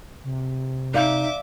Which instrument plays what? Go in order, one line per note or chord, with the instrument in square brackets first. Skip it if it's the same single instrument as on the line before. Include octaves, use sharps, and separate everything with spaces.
[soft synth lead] C3
[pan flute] D#4 [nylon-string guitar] D5 F5 [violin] E5 D6